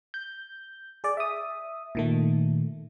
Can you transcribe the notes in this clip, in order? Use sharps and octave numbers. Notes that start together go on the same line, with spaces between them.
G6
G#4 D5
E5 D#6
A#2 D#3 A3